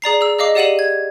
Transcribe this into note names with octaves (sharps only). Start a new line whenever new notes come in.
G#4 D5 A#5 C7
G#4 E6
G#4 D#5 F5 D6 C7
G4 D5 F#5 D#7 E7 F#7
G#6